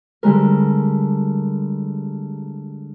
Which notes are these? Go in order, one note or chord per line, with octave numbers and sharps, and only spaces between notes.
D3 G3 G#3 A#4